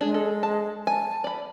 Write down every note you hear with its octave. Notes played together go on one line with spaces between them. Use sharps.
G#3 D4 G#4
A4
A5
G#5 A5
D5 B5